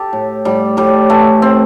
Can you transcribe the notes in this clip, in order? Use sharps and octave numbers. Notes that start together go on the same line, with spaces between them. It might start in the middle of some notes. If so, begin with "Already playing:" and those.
Already playing: G4 A4
A2
A2 G3
A2 G3
E3 A3
C4